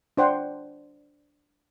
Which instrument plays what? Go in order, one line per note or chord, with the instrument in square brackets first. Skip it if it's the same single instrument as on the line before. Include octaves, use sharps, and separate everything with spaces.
[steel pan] D4 C5 F#5 G5 C6